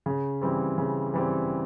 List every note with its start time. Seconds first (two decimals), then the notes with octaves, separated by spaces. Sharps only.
0.06 C#3
0.41 E3 G3 C4
0.78 C#3
1.14 E3 G3 C4